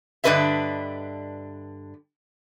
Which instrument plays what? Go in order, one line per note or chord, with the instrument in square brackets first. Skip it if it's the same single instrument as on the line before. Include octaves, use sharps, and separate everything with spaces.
[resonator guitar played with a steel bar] G2 D3 D4 B4 D#5 E5